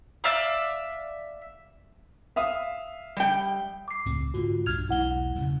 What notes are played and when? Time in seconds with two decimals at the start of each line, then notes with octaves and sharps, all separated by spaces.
0.24 D5 E5 F5 D6
2.36 E5 F5 D#6
3.17 G3 G5
3.88 D6 C7
4.05 C#2 A2 C4
4.34 G#2 D3 F4 F#4
4.66 B1 G2 D4 F6 G#6 F7
4.89 B1 E2 G#3 E4 F#5 G7
5.35 D1 D2 C#3